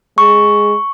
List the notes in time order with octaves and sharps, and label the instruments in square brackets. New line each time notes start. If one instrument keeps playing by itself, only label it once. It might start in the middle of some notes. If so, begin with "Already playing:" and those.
[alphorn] G#3 [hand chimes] C#6